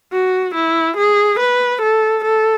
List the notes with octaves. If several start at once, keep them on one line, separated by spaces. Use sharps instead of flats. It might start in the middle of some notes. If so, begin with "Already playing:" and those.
F#4
E4
G#4
B4
A4
A4